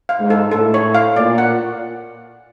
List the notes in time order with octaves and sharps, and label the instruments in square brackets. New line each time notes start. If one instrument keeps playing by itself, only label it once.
[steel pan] F5
[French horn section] G#2
[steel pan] A4
[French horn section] A2 [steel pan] A4
[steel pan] C#5
F5
[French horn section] A#2 [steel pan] D5
[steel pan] F#5